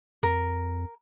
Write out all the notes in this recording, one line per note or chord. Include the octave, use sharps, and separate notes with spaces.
F2 A#4